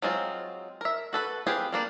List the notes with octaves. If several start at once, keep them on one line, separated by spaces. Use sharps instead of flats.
F#3 G#3 C4 F4
A#4 E5
F#4 A4 B4
C4 F4 G4 G#4 B4
G3 A#3 D4